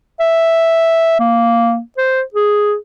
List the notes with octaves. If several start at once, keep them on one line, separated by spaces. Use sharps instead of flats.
E5
A#3
C5
G#4